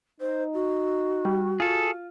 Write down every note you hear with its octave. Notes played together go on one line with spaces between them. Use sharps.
D#4 C5
F#4
G3
F4 G#4 A4